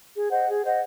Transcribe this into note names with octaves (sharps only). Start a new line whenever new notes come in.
G#4
C5 D#5 F#5
G#4
C5 D#5 F#5